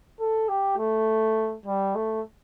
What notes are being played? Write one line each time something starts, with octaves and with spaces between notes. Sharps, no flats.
A4
G4
A3
G3
A3